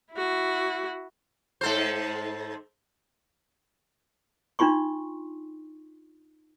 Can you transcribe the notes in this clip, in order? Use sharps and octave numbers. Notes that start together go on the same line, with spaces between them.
E4 F#4
G#2 A4 C5
D4 D#4 F4 C6 C#6